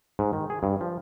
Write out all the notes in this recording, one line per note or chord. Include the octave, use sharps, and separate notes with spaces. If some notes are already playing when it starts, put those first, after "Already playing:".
G#2
D#3
G#4
G2
F3